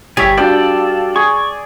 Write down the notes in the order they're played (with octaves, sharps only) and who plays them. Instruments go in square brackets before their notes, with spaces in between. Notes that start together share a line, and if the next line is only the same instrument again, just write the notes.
[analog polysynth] G1 G#6 [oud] G3 [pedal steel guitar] G#4 C#5 E5
[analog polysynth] D4 F#4 F5 [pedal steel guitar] A4 [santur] D5 G5
[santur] G#4 [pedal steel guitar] C#6